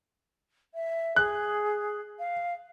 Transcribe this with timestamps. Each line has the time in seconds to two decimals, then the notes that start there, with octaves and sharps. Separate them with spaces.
0.74 E5
1.16 G#4 F#6
2.19 F5